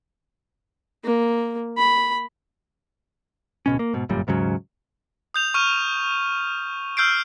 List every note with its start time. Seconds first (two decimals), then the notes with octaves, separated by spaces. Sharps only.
1.04 A#3
1.77 B5
3.66 D1 B2 C#4
3.79 A#3
3.94 G#2 B2
4.09 G1 F#2 A#2 G3
4.27 D#2 G#2 C#3 F#3
5.34 D#6 G6 F7
5.54 C#6 F6 D#7
6.97 E6 F6 G6 C7 D7